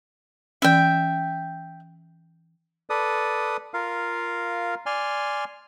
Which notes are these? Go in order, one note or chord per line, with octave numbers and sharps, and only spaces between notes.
E3 C#4 E5 G5
A4 B4 D5 D#6
F4 A#4 F5
D5 G#5 C6 F6